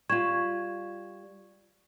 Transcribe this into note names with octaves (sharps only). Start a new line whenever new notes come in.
G3 F4 C#6 G#6 E7